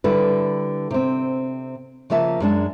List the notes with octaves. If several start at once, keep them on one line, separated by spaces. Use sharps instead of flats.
D3 G3 E4 A4 B4
C3 C4
C#3 F3 A#3 E5 A5
F#2 G#3 D4 A5